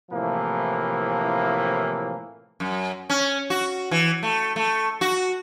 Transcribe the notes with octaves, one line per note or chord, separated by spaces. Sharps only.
A2 C3 E3 F3 A#3
F#2
C#4
F#4
E3
A3
A3
F#4